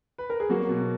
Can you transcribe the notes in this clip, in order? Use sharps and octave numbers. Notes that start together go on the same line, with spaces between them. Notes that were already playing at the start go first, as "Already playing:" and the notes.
B4
A#4
G#4
F#3 A#3 F#4
B2